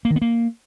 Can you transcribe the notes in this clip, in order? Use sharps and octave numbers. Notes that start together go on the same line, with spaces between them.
A#3
D#3
B3
A#3